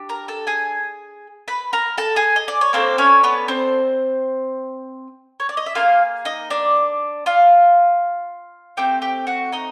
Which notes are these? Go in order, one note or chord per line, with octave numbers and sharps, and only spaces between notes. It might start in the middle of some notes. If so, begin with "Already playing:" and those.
Already playing: D4 G4
A#4 A#5
A4 A5
G#4 G#5
B4 B5
A#4 A#5
A4 A5
G#4 G#5
D#5
D5
C#5
A#3 C4 D4 A4 C5
C#4 C#5
B3 B4
C4 C5
C#5
D5
D#5
E5
A#3 D#4 F4 G#4 F5
D#4 D#5
D4 D5
F4 F5
A3 C4 G4 G5
G4 G5
F#4 F#5
D#4 D#5